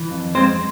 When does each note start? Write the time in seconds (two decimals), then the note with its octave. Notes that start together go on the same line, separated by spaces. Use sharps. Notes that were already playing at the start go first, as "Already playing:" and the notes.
Already playing: E3
0.11 F2
0.35 G#3 C4 C5